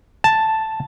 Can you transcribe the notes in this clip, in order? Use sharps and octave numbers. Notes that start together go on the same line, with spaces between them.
A5